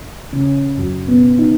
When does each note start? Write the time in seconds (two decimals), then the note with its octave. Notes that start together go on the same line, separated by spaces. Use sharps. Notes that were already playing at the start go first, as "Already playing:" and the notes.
0.33 C#3 C#4
0.78 F#2 F#3
1.08 B2 B3
1.39 D#3 D#4